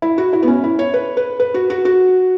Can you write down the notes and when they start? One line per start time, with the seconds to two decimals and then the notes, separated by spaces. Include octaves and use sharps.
0.02 E4
0.18 F#4
0.33 E4
0.43 B3
0.48 C#4
0.64 E4
0.79 C#5
0.94 B4
1.17 B4
1.40 B4
1.54 F#4
1.70 F#4
1.85 F#4